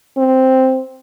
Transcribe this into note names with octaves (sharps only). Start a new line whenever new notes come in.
C4